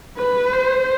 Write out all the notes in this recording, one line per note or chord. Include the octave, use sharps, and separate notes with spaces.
B4
C5